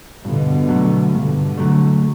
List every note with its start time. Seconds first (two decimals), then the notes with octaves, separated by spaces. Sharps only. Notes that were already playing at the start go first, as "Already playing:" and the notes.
0.25 G2 B2 D3
0.69 F#3 A3
1.13 G2 B2 D3
1.58 F#3 A3